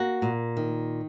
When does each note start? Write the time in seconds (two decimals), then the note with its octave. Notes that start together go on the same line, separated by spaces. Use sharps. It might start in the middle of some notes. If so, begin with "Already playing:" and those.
Already playing: A#3 F#4
0.22 A#2
0.57 D#3